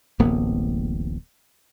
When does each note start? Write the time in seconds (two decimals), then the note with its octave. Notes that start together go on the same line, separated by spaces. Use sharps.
0.19 D1 A1 A#3 B3